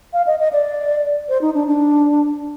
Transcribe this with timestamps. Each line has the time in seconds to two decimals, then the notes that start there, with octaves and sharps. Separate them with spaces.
0.13 F5
0.27 D#5
0.40 D#5
0.53 D5
1.29 C5
1.41 D#4
1.54 D4
1.67 D4